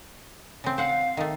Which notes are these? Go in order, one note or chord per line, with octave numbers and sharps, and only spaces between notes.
C#3 C4
C5 F5 F#5
D#3 A3